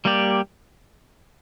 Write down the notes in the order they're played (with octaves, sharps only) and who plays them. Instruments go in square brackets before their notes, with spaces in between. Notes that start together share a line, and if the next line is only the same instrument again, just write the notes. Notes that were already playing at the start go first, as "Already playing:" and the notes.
[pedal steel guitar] G3 A#3 G4 D5